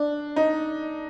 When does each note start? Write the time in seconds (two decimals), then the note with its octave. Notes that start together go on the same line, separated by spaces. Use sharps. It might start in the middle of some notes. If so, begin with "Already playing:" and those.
Already playing: D4
0.36 D#4